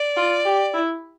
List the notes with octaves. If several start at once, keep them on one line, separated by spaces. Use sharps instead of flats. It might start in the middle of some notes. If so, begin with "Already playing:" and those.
Already playing: D5
F4
G4
E4